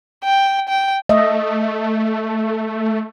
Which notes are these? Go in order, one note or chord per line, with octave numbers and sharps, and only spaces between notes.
G5
G5
A3 D#5 E5